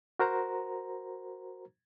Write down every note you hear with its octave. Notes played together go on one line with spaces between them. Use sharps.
F#4 A#4 C5 A#5